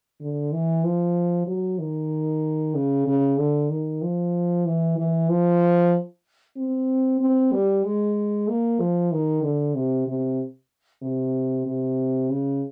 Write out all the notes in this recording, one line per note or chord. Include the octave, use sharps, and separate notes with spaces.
D3
E3
F3
F#3
D#3
C#3
C#3
D3
D#3
F3
E3
E3
F3
C4
C4
G3
G#3
A#3
F3
D#3
D3
C3
C3
C3
C3
C#3